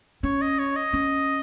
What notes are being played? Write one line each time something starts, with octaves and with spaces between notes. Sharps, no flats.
C#4 C#5
D#5
C#5
D#5
C#4